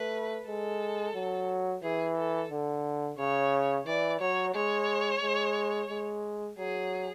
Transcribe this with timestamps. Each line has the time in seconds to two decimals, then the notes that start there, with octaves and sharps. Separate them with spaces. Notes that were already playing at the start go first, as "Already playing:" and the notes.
Already playing: A3 B4
0.46 G#3 A4
1.15 F#3
1.82 E3 G#4
2.17 A4
2.51 D3
3.18 C#3 C#5
3.86 E3 D5
4.20 F#3 C#5
4.55 G#3 C#5
5.23 G#3
5.90 G#3
6.58 F#3 G#4